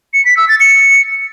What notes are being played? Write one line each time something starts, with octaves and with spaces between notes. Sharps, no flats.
C#7
B6
E6
A6
C#7